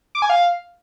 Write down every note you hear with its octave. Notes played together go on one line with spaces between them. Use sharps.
D6
G#5
F5